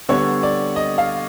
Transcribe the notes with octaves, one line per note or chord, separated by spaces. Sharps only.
D3 G3 B3 C#5
D5
D#5
F5